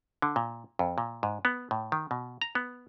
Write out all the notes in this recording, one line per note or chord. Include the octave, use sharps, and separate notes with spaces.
D3
A#2
F2
A#2
G#2
B3
A2
D#3
B2
A#5
B3